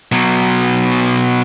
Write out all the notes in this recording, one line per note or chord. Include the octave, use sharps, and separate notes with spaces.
B2 F#3